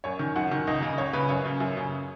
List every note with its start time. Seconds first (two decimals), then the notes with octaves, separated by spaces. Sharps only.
0.04 F#2 C#5
0.19 D#3
0.36 F#2 F#5
0.52 D#3
0.67 C#2 D#5
0.83 C#3
0.98 C#2 C#5
1.13 C#3 B4
1.29 F#2 C#5
1.45 C#3
1.60 F#2
1.77 C#3